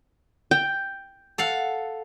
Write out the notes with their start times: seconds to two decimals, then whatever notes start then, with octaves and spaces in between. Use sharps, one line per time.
0.51 G5
1.38 A4 F5 F#5